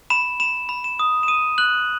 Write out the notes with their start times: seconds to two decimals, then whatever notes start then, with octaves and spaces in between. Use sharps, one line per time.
0.10 B5 E7
0.40 B5 E7
0.69 B5
0.84 E7
0.99 D#6
1.23 E7
1.28 D#6 D#7
1.58 F#6 F#7